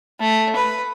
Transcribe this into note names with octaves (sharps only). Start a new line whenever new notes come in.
A3
B4